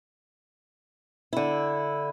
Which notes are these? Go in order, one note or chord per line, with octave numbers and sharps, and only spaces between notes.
D3 E4